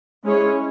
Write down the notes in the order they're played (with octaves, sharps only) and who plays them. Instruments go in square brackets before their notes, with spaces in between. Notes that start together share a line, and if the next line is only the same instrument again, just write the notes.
[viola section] G#3 C#4 E4 G#4 C#5